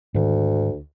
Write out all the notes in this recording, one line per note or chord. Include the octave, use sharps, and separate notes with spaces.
D2 G#2 D#3